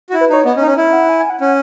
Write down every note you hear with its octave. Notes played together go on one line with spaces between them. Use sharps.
F#4
E4
B4
D#4 C#5
B3 D#5
C#4
D#4
C#4
E4 E5
F#5
G#5
G#5
F#5
C#4 F#5